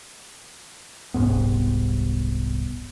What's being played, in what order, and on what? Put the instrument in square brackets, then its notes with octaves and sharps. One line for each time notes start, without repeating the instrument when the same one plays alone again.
[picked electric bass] D#1 C2 G#2 B3